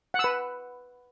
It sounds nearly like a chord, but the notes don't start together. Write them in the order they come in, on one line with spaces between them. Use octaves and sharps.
F#5 E6 B4